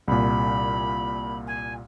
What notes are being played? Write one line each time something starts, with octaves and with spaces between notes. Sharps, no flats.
C2 A#2 B5
G#5